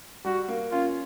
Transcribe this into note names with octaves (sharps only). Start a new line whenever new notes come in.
G3 F#4
A#3
C#4 F4